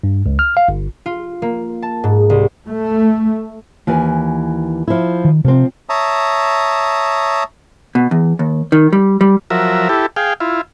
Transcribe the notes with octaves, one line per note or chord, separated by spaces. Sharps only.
G2
C#2
F6
F5
G1
F4
A#3
A5
G#2
C2
A3
D#2 E3 G#5
F3 E4
D#3
C3 F3 C4
C#5 E5 A5 A#5 D#6
B2
E2
D#2
D#3
G3
G3
F3 F#3 A#4 E5
E4 G4 A4
G#4 F5 G5
E4 F4